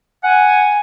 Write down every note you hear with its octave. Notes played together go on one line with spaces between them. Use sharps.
F#5 G#5